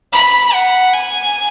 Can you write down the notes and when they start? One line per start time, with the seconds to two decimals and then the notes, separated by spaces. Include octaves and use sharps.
0.12 B5
0.53 F#5
0.93 G#5